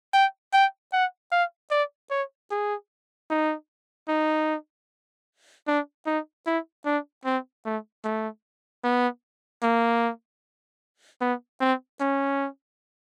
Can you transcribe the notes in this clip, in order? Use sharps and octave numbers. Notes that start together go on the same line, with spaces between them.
G5
G5
F#5
F5
D5
C#5
G#4
D#4
D#4
D4
D#4
E4
D4
C4
A3
A3
B3
A#3
B3
C4
C#4